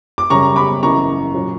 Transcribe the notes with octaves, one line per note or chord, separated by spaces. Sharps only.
D6
F#2 C#3 G3 C#4 A#5 C#6
B5 D6
F#1 F#2 E3 A#5 C#6
A#2 F#3 C#4